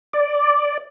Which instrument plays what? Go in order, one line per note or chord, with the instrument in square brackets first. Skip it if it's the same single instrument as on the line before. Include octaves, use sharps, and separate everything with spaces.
[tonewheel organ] D5